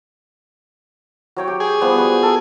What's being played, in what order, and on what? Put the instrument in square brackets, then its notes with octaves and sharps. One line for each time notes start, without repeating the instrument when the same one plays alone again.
[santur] F#3 C#5 G5
G4
[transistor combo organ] G#4
[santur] F3 G3 B3
F#4 B4
A4 A#4